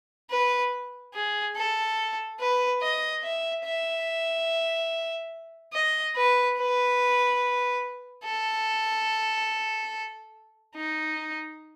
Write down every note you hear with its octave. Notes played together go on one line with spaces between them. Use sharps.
B4
G#4
A4
B4
D#5
E5
E5
D#5
B4
B4
A4
D#4